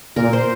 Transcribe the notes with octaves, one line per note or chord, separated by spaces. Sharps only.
A#2 A#4
C5